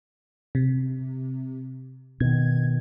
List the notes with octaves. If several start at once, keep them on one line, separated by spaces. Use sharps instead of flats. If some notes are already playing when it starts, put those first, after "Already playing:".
C3
B2 D#3 G#6